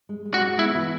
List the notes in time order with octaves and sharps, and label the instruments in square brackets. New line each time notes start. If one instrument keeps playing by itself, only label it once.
[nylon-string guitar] G#3
G#3
[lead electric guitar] F#4
[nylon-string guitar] G#3
[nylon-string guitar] B3 [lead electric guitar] E4
[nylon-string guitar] E3